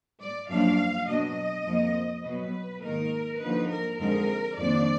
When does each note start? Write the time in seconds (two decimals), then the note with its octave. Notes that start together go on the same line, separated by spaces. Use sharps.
0.20 D5
0.49 F#2 F3 A#3 D4 F5
1.07 B2 F#3 D4 D#5
1.66 F2 F3 A#3
2.24 B2 F#3 B3 B4
2.82 G#2 D#3 A#3 D#4 A#4
3.40 D3 F3 A#3 D#4 B4
3.70 A#4
3.99 F2 D3 G#3 D#4 A#4
4.57 F2 D#3 A#3 D4 D5